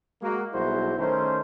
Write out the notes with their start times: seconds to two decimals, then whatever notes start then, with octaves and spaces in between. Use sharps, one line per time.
0.23 G#3 A#3 F#4
0.53 B1 G3 E4 F#4 G#4 C5
0.99 D#3 A3 C#4 A#4 C5